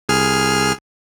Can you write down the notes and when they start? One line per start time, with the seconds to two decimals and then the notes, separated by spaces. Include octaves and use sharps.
0.09 C2 G#4 F6